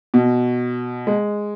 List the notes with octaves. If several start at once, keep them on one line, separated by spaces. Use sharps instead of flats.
B2
G#3